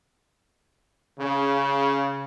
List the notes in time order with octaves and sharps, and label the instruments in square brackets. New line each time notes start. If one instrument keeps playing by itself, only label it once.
[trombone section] C#3